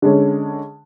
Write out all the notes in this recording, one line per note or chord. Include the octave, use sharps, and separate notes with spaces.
D3 G#3 C#4